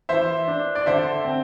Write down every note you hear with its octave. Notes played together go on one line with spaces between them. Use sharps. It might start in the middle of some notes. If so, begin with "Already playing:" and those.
E3 C5 E5
D4
D5
D3 C5 E5
C4